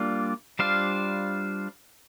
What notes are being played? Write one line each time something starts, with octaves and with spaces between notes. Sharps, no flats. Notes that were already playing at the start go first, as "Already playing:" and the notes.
Already playing: G3 A#3 D4 F4
G3 D4 F4 C5 F5